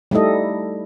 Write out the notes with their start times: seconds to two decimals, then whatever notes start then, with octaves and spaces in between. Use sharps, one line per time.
0.11 G3 A3 D#4 E4 A4 D#5